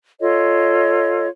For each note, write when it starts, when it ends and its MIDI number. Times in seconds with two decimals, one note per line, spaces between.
0.20 1.28 65
0.20 1.28 69
0.20 1.28 73
0.20 1.28 75